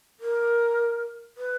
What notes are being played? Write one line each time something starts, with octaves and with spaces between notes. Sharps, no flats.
A#4
B4